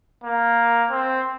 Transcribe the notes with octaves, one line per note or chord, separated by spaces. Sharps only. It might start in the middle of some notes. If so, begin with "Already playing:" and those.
A#3
C4